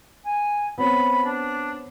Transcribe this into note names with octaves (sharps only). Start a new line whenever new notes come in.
G#5
B3 C4 C#5 B5
D4